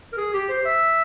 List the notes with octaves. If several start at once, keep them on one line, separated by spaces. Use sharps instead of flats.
A#4
G#4
G4
C5
E5